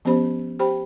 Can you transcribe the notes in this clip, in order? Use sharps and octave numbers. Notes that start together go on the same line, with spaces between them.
F3 B3 C#4 G4 C5 B5
G4 C5 G5 B5